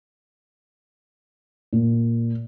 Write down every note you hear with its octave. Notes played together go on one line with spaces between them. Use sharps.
A#2